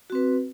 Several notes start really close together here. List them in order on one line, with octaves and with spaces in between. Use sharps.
F#4 C4 B4